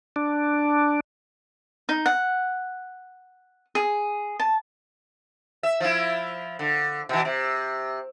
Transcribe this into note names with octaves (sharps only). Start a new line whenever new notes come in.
D4
D#4
F#5
G#4
A5
E5
F3 E4
D3
B2 E3
C3